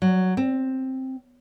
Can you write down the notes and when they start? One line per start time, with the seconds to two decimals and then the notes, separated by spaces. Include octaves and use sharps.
0.02 F#3
0.37 C4